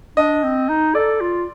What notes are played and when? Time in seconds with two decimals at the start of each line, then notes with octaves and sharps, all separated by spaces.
0.17 D4 D#5
0.43 C4
0.69 D#4
0.95 A4 D5
1.21 F4